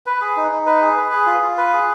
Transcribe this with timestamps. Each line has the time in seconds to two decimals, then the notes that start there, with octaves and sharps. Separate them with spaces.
0.06 B4
0.21 G#4
0.37 D#4
0.52 D#4
0.66 B4
0.81 G#4
0.97 B4
1.12 G#4
1.26 F4
1.42 F4
1.57 B4
1.73 G#4